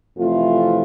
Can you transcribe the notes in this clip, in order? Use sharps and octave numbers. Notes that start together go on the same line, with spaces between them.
F2 C3 E3 A3 F4